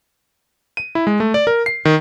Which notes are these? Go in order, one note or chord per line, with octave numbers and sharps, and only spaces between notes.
D#7
E4
G#3
A3
D5
A#4
C7
D#3